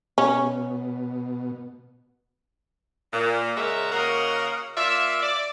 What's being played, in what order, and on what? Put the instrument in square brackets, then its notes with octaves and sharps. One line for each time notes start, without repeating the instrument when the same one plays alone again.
[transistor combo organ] B2 [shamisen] C#4
[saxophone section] A#2
C#3 G#3 F#4 A#4 E5
C#3 A#3 F#4 A#4 D#5 F#5
A#3 F4 D5 E5
D5